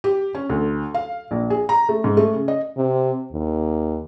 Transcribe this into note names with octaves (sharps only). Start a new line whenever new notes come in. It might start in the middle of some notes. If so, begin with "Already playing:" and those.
G4
C#4
D2
F5
A#1
G#4
A#5
A3
G#2
A3
C#3
D#5
C3
D#2